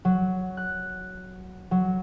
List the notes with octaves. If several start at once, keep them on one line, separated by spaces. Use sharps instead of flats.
F#3
F#6
F#3